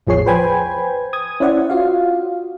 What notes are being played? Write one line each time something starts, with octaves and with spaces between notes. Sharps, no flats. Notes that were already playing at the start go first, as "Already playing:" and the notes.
A1 E2 F3 G#4 C#5 C7
B4 C5 G5 G#5 B5 G#6
D#6 G#6
C#4 E4 C5 D5 E5 F#5
F4 F#4 F5